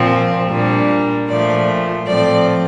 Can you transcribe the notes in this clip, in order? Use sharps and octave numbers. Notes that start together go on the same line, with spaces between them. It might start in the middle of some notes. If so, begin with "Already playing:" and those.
Already playing: A#2 F3 C4
A#2 G3 A#3 D4
A#2 F3 A3 D5
A2 F3 A3 C4 D5